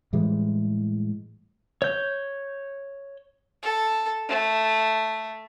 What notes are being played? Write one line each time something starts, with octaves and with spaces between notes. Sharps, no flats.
A2 E3 G3 G#3
C#5 G6
A4
A3